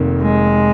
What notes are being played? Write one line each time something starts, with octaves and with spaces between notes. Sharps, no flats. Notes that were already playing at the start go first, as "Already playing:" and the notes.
Already playing: F1 F2 D#3 A#3
G#3